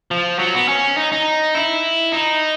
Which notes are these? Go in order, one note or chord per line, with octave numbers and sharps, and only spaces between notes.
F3
F#3
B3
C#4
D#4
D#4
E4
D#4